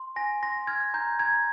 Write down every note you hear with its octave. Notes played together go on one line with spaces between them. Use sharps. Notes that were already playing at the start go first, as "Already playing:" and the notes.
Already playing: C6
G#5 A#6
C6 A#6
F6 G#6
A#5 G6
A#5 G#6